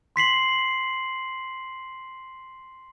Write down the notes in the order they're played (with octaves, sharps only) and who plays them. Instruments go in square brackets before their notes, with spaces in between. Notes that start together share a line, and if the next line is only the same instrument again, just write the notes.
[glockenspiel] C6 B6 C7 F#7